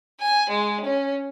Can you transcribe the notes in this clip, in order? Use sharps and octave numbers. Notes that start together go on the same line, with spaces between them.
G#5
G#3
C#4